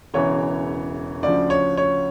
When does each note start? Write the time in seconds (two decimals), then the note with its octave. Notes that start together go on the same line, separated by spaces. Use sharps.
0.14 E1 E2 C#3 E3 C#5
1.22 D2 C#3 F3 D5
1.50 C#5
1.77 C#5